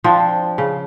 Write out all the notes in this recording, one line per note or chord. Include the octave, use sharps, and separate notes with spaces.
F3 C4 D4
C#3